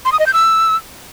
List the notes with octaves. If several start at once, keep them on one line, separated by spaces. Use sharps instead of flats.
C6
D#6
D#5
G6
E6